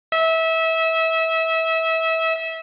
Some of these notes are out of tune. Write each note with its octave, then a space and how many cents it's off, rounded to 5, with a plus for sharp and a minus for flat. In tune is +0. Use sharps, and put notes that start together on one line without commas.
E5 -25